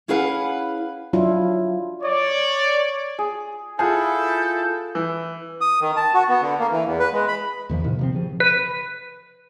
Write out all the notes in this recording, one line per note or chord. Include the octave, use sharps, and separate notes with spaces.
C#4 E4 G#4 B4 F5 F#5
F#3 D4 E4 F4
C#5 D5
G#4
E4 F4 G#4 A4 F#5 A5 G6
E3
D#6
D#3
A5
F#4
B3
D3
A#3
E3
E2
B4
G#3
B5
E2 D#3 F3 A#3
A2 C3 D#3
C3 F3 C4
C#3 F3
B4